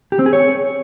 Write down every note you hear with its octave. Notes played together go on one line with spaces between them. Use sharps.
G4
C4
G#4
C#5